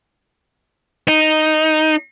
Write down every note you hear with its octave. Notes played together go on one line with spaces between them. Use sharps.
D#4